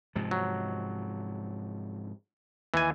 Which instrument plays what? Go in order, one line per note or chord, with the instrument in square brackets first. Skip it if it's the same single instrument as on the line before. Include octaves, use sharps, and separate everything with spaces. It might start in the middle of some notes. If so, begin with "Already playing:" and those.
[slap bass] G#2 C3 F3
[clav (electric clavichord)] F#3
[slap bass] D#2 [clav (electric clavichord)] E3 G#5